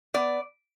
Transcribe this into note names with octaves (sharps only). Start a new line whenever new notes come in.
B3 D5